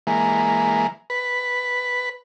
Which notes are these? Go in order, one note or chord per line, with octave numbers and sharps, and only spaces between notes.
E3 G#3 A#3
B4